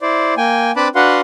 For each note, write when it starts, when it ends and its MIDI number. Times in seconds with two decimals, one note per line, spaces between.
0.01 0.34 64
0.01 0.34 72
0.01 0.34 74
0.37 0.72 58
0.37 0.72 79
0.37 0.72 80
0.76 0.88 60
0.76 0.88 62
0.76 0.88 71
0.76 0.88 81
0.76 0.88 83
0.76 0.88 86
0.95 1.21 62
0.95 1.21 66
0.95 1.21 71
0.95 1.21 77
0.95 1.21 78
0.95 1.21 84